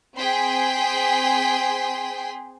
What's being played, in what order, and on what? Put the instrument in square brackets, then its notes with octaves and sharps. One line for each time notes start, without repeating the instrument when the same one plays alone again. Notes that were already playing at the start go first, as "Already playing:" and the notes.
[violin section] C4 G#4 G5 C6 B6